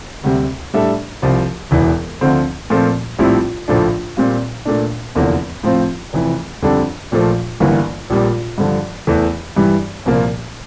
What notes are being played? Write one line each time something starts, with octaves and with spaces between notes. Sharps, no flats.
D2 C3 G3
A2 G3 D4 A4 E5
C2 C3 F3
E1 E2 E3
D2 D3 F3 C4
A#2 F3 A3 C4
A#1 A2 G3 C4 E4
A#1 A2 F3 A3 D4
A#2 G3 C4 F4
A#2 A3 D4
F1 E2 D3 F3 A#3
A2 F3 C4 F4
F1 F2 E3
F2 D3 G3 D4 A4
A#1 A#2 F3 A3
G1 G2 E3 A#3
A#1 A#2 G3
G2 D3 F3
E2 E3 A3
G2 E3 G3
C2 A#2 F3 A#3